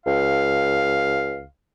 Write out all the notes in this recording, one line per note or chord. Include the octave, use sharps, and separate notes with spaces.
C#2 F5